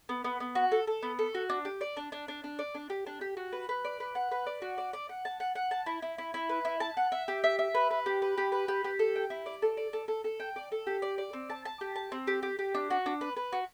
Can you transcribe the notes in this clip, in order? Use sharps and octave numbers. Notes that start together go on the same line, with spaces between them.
B3
B3
B3
F#4
A4
A4
B3
A4
F#4
D4
G4
D5
D4
D4
D4
D4
D5
D4
G4
D4
G4
F#4
B4
B4
D5
B4
F#5
B4
D5
F#4
D5
D5
F#5
A5
F#5
F#5
A5
E4
E4
E4
E4
B4
E4
A5
F#5
E5
G4
E5
E5
B4
B4
G4
B4
G4
B4
G4
G4
A4
G5
E4
D5
A4
D5
A4
A4
A4
G5
D5
A4
G4
D5
D5
C4
A5
A5
G4
A5
C4
G4
G4
G4
D4
F#4
D4
B4
B4
F#4